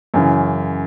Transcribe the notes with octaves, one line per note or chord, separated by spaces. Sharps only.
F#2 C#3 E3